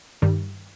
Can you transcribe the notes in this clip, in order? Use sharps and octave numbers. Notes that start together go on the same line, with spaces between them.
G2 D#3 G3